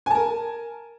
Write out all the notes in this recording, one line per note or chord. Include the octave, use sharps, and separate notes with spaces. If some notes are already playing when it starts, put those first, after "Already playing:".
A#4 G#5 A5